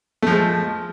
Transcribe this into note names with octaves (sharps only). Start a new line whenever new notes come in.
F3 G#3 A3